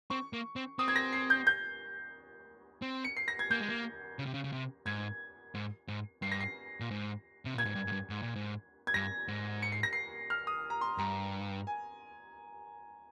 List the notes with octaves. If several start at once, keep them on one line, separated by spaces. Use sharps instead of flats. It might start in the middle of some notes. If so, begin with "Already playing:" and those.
C4 C#6
A#3
C4
C4 D#6
G#6
A#6
C7
G6
G6
C4
C#7
C7
A#6
G#6
A#3 G6
G#3
A#3
C#3
C3
C#3
C#3
C3
G#2 G#6
G#2
G#2
G2 C7
A#6
C7
A#2
G#2
C3
A#2 G#6
G#2
G2
G#2
G2
G#2
A#2
G#2
G#6
G2 A#6
G#2
C#7
C7
A#6
C7
F6
D#6
A#5
C6
G2 A#5
G#5